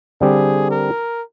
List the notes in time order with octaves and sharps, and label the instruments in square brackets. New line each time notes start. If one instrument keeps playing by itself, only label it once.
[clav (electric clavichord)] D3 G3 C4 G4 [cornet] G#4
[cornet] A#4